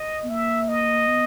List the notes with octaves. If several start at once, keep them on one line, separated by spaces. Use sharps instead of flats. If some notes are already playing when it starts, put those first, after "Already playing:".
Already playing: D#5
B3
A#3 E5
D#5
B3